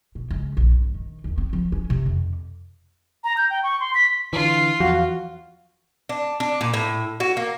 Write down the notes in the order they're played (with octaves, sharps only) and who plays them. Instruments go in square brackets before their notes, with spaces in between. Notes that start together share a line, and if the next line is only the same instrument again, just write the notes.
[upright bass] B2
C#2
A#1
G2
D#3
D#2
C4
F3
C#4
C3
F2
[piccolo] A#5
G6
G5
C#6
C6
B6
[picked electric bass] D3 E3 [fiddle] F4
[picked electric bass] E2 F3 F#3 [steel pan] F#4 [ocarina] F5
[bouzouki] D4
D4
A#2
A2
F#4
A#3